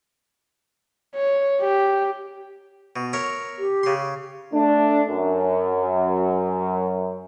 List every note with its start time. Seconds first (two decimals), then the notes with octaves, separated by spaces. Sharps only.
1.15 C#5
1.61 G4
2.96 B2
3.13 A#4 C#5 E5
3.58 G4
3.83 C#3 C6
4.53 A3 D4
5.09 F#2